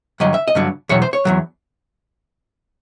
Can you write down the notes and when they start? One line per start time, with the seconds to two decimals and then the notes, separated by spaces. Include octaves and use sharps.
0.20 G2 D3 F#3 D#5
0.34 E5
0.48 D#5
0.55 G2 D3 F#3
0.89 E2 B2 F#3 C#5
1.02 C5
1.13 C#5
1.25 E2 B2 F#3